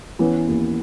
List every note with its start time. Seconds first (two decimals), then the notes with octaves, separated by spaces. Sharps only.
0.19 E3 B3 C#4
0.48 D#2